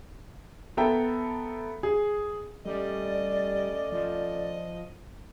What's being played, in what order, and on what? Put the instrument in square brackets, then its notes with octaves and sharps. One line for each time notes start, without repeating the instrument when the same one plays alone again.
[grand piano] B3 A4 E5 G5 A#5
G#4
[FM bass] G3 [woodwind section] A3 C#4 D5 [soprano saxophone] D#5
[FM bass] F3 [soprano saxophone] D#5